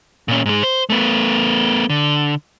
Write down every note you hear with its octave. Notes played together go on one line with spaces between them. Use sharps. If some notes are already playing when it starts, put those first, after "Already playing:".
A#2 C#4
G#2 G#3
C5
A3 B3
D3